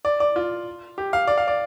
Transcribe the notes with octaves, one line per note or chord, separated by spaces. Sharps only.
D5
D5
F4
G4
F5
D5
F5
D5